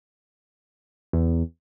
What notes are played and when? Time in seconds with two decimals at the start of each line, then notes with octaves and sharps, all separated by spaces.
1.13 E2